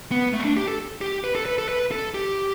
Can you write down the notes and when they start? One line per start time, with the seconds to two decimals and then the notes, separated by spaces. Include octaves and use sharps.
0.11 B3
0.33 A3
0.39 B3
0.45 D4
0.56 G4
0.68 A4
1.01 G4
1.24 B4
1.35 A4
1.46 B4
1.58 A4
1.69 B4
1.91 A4
2.14 G4